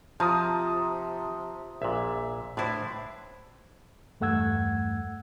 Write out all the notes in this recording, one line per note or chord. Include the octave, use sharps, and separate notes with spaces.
C3 F3 F4 A5 A#5 D#6
A#1 A#2 E5
A2 D4 E4 B4 C5
E2 G2 A3 F#5 E6 G#6